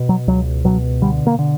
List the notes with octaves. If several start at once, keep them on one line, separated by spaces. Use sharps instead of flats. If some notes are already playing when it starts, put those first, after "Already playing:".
Already playing: B2
F#3
C#2 F#3
B2 F#3
D3 G3
A#3
D3